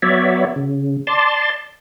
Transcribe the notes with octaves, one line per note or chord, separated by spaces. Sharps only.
F#3 B3 C#5 D5 E5
C#3
D5 A5 C6